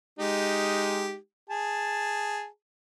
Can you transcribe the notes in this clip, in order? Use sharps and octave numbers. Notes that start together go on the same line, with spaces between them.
G#3 D#4 G4
G#4 A5